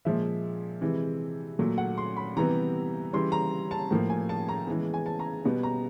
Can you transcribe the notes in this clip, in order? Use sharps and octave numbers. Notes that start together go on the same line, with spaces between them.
A#2 F3 G#3 E5
C3 E3 G#3
A#2 F#3 A3
F#5
C6
B5
C3 E3 G3 B3 A#5
C#3 E3 G3 C6
A#5
A5
A2 F3 A#3
G#5
A5
A#5
C#3 E3 G#3 B3
G#5
A5
A#5
B2 G3 B3
A#5